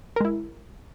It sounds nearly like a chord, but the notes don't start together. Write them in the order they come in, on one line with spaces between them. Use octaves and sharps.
A#4 G#3 E4